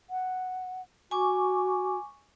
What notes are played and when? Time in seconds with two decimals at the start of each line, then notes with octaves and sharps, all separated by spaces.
0.10 F#5
1.11 F#4 G#5 C#6 D6